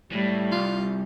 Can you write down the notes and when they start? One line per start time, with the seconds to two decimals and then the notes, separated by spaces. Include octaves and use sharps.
0.12 A2 G3
0.52 C2 F4